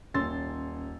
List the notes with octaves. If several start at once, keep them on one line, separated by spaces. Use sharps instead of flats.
D#1 C#4 C6 E6 A6